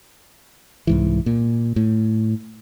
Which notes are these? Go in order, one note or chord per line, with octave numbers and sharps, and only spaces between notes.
C2 G#2 E3
A#2
A2